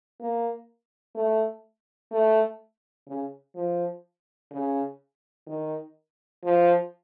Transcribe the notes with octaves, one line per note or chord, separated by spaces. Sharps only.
A#3
A3
A3
C#3
F3
C#3
D#3
F3